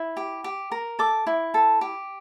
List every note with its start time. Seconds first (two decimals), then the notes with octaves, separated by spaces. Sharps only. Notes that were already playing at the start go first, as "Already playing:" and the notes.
Already playing: E4
0.17 G4
0.44 G4
0.72 A#4
0.99 A4 D6
1.27 E4
1.54 A4
1.81 G4